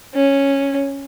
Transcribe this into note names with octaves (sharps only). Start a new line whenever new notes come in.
C#4